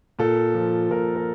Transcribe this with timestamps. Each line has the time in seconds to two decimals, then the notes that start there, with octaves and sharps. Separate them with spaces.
0.19 A#2 A4
0.54 F3
0.90 A#2 A#4
1.16 A#4